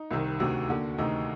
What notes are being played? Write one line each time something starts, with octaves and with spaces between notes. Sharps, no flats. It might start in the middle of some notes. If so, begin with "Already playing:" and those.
Already playing: D#4
C2 C3 D#3
D2 C3 D#3 F#4
D#2 D3
D2 C3 D#3 D#4